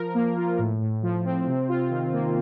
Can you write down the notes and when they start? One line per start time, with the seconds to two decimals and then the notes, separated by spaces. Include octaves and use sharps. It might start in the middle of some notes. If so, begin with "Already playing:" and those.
Already playing: F3 A#4
0.14 A#3
0.37 F4
0.59 A2
0.81 A2
1.02 F3
1.25 C4
1.47 C3
1.68 F4
1.90 D#3
2.13 A#3